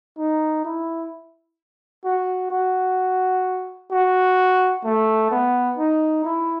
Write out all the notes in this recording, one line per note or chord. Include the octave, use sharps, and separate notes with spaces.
D#4
E4
F#4
F#4
F#4
A3
B3
D#4
E4